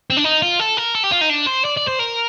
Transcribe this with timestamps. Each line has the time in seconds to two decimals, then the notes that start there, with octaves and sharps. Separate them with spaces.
0.10 C4
0.17 D4
0.24 D#4
0.42 F4
0.59 A4
0.77 A#4
0.94 A4
1.03 G4
1.11 F4
1.21 D#4
1.29 D4
1.46 C5
1.65 D5
1.77 D5
1.87 C5
1.99 A#4